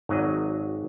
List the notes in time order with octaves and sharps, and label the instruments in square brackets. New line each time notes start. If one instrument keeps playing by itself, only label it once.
[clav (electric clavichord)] G#1 F#3 D#5